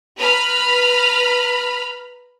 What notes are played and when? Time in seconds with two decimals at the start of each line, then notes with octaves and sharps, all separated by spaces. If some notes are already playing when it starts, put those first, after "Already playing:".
0.17 B4 A#5 B5 F6